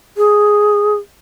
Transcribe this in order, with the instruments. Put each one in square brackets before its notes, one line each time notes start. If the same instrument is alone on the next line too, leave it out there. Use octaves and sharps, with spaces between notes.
[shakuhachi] G#4